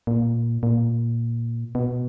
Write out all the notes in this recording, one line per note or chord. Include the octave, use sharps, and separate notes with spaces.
A#2
A#2
B2